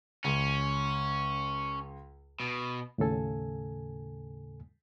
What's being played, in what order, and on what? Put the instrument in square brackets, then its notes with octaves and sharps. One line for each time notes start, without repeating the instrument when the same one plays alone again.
[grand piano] C#2 [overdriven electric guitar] C#4
[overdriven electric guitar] B2
[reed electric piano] D#2 A2 C#3 A4 G#5